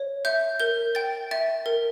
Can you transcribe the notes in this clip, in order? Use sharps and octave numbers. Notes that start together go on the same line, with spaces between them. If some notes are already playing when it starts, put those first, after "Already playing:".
Already playing: C#5
E5 G6
A#4 G6
G5 A6
E5 A6
A#4